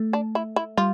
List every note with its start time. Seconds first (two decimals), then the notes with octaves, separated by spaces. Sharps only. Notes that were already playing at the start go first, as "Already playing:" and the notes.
Already playing: A3
0.13 D4
0.35 E4
0.56 E4
0.77 G3 F4